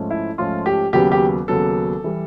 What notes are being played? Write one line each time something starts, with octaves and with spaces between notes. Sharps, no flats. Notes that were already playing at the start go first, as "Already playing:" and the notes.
Already playing: G#2 F3 A3 C#4
E4
G#2 F3 A3 C#4 F4
G4
D#2 C#3 F#3 B3 G4
G4
D#2 C#3 F#3 B3 A4
E3 G3